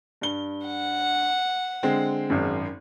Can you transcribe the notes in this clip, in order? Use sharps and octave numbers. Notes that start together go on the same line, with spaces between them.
G2 G7
F#5
D3 G#3 C4
G#1 F#2